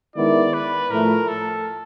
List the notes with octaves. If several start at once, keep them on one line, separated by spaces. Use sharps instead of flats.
D#3 G#3 B3 E4 D5
B4
A2 F3 A3 A#4
A4